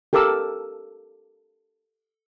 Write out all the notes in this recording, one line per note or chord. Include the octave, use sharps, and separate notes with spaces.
G4 A4 A#4 D6 E6